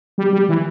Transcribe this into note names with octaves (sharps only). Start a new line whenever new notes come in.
G3
G3
E3